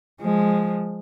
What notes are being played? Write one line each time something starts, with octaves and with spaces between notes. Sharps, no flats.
F3 G#3